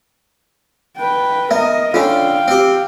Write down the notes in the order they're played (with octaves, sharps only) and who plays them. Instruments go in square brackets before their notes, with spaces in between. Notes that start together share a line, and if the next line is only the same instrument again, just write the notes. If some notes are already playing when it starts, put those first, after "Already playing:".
[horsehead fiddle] B4 G5
[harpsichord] B3 [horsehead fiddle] A#4 D#5 [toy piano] E5
[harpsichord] D3 C#4 [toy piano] F4 [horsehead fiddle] F5 G5
[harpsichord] C4 G4